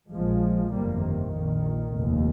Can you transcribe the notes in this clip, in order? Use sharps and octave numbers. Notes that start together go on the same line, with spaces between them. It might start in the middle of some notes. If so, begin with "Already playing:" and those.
A#1 A#2 F3 G#3
G1 F2 C3 G3 A#3
D#3
A#1 A#2
F1 D#2